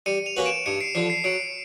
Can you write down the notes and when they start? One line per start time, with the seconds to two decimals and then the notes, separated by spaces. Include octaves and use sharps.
0.06 G3 C#7 D#7
0.26 D#7 F7
0.36 A#3 C#4 F#4 B4
0.46 D7 E7
0.66 G2 C#7 D#7
0.80 C7 D7
0.95 D3 F3 C7
1.10 C7
1.24 F#3 C7 D7